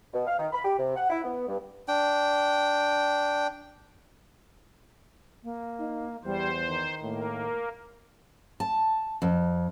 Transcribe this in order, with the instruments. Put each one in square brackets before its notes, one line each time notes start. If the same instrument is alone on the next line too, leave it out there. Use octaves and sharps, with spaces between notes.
[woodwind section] B2
F5
D#3
B5
G4
C3
F#5
E4
B3
G2
[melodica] D4 G5
[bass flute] A#3
[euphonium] D#4
[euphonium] E2 [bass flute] G3 [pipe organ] C5
[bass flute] D#3
[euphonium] A2 [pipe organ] A#3
[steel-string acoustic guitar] A5
F2